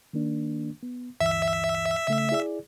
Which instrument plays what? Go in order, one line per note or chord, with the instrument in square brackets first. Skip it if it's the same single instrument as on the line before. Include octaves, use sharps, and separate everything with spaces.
[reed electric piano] D#3 A#3 D4
B3
[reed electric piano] D2 G2 E3 [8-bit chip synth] E5
[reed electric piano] C#3 A3
E4 G#4 D5